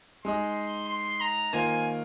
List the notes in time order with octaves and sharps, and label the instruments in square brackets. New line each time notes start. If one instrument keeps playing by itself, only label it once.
[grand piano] G#3 D#4 G#4 D#5 [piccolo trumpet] C6
[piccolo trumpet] C6
A#5
[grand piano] D#3 A#3 F4 C5 F5 [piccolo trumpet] G#5